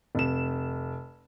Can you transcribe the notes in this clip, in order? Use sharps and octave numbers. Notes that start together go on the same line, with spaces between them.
F1 E7